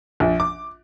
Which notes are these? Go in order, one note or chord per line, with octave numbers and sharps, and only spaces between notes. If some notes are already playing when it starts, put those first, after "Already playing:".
A#1
D6